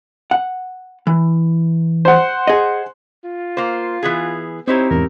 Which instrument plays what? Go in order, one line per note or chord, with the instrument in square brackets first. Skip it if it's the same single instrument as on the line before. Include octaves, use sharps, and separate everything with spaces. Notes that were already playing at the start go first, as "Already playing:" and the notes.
[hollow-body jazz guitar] F#5
E3
[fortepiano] C5 F#5
[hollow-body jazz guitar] G#4 D#5
[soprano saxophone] F4
[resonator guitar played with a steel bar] A#3 C5
E3 B3 G#4
[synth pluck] C4 G4 [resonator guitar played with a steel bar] D#4 E4 C#5 [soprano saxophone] C5
[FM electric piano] E2 G#2 [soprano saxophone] A#4